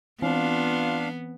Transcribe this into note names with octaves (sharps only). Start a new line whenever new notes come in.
E3 B3 C4 D4 F4 F5